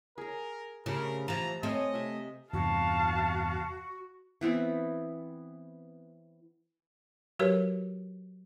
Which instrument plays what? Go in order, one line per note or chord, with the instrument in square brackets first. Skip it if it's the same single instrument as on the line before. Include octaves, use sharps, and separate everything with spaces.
[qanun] G#4 A#5 [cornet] A#4
[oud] C#3 [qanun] A3 G4 C5 [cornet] A#4
[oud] E3 F3 [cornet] A#5
[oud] A3 C4 [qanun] A#4 C#5 G#5 [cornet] D#5
[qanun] C3 E5
[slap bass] E2 G2 C3 [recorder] F#4 [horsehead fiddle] F5 A5
[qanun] E3 B3 C4
[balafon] F#3 F#4 G4 A#4 B4 C#5